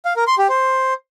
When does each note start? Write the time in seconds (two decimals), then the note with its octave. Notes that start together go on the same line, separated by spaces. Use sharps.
0.05 F5
0.16 A#4
0.27 C6
0.38 G4
0.49 C5